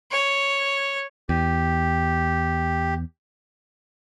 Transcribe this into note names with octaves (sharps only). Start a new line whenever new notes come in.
C#5
E2 G4